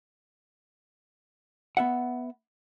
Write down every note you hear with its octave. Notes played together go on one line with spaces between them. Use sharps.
B3 E5 F#5